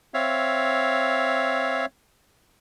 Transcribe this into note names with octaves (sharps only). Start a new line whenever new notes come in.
C4 C#5 E5 F5